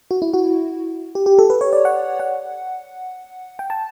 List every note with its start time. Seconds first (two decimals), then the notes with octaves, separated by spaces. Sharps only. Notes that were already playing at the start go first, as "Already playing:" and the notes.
0.11 F#4
0.22 E4
0.34 F#4
1.15 G4
1.26 G4
1.39 A4
1.50 B4
1.61 C#5
1.73 D5
1.85 F#5
2.20 F#5
3.59 G5
3.70 A5